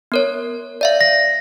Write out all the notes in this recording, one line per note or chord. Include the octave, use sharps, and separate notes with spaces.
B3 A#4 C#5
D5 E5 F5
A#6